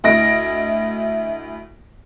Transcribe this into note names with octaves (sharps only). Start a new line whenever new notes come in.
D2 E4 D#5 A#6 D7